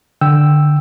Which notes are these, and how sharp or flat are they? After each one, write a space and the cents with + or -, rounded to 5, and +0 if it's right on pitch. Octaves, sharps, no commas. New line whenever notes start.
D3 +15 G5 +0 E6 +0